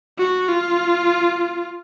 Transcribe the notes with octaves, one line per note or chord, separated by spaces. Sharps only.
F#4
F4